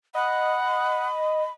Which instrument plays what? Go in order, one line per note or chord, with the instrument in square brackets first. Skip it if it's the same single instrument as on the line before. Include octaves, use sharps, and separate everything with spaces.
[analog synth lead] D#5 [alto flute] F#5 [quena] B5